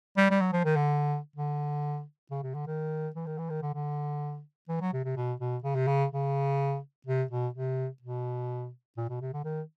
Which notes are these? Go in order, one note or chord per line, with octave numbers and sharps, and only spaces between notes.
G3
G3
F#3
F3
D#3
D3
D3
C#3
C3
D3
D#3
E3
D#3
E3
D#3
D3
D3
E3
F#3
C3
C3
B2
B2
C#3
C3
C#3
C#3
C3
B2
C3
B2
A#2
B2
C3
D3
D#3